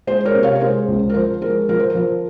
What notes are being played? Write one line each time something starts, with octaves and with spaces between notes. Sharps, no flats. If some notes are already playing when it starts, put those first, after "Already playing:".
G#3 C5
A#4 C#5
C3
C#5 F5
A#4
G#3 C5
C#2
A#4
F3 C5
G#3 A#4
F3 A#4
C5
F3 A#4